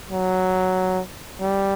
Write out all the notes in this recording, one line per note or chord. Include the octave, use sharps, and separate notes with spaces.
F#3
G3